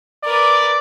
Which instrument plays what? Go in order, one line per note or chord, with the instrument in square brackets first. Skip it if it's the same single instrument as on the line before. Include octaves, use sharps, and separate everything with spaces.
[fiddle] A#4 B4 [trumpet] D5